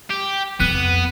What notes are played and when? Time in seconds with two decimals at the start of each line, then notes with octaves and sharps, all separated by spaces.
0.10 G4
0.60 F2 B3 F#6 D#7